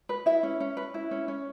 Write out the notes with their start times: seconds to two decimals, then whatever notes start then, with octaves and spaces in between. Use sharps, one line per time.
0.09 B4
0.26 E4 E5
0.43 C#4
0.60 C#4
0.77 B4
0.94 E4
1.11 C#4
1.28 C#4